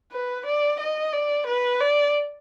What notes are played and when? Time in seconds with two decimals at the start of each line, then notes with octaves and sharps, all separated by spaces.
0.12 B4
0.46 D5
0.80 D#5
1.13 D5
1.47 B4
1.80 D5